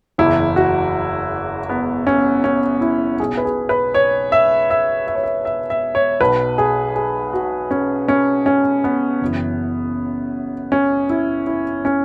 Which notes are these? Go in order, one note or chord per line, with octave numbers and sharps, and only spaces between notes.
F#1 E2 E3 E4
F#4
B3
C#4
C#4
E4
B1 B2 G#4
B4
G#4
B4
C#5
E5
E5
E5
C#5
E5
E5
E5
C#5
B1 B2 B4
G#4
G#4
F#4
C#4
C#4
C#4
B3
F#1 F#2 E3
C#4
E4
E4
C#4